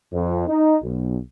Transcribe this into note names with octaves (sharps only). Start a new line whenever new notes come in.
F2
D#4
B1